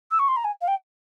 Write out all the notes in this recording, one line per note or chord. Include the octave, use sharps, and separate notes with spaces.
E6
C#6
C6
A#5
G#5
F5
G5